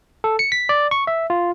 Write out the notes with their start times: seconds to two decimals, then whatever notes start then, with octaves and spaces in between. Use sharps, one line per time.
0.24 A4
0.39 C#7
0.52 B6
0.69 D5
0.91 C#6
1.07 E5
1.30 F4